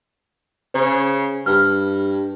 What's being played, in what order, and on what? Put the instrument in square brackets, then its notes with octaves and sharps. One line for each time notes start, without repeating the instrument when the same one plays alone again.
[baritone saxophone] C#3 [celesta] C5
[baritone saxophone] G2 [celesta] F6